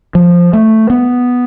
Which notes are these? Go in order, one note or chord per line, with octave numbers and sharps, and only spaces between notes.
F3
A3
B3